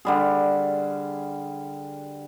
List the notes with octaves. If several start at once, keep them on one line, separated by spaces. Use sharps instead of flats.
D3 G3 G#4